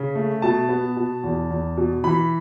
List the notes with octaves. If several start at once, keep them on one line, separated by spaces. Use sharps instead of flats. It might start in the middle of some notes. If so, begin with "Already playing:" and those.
Already playing: C#3
A3
B2 A5
B3
B2
E2
E2
B2
E3 B5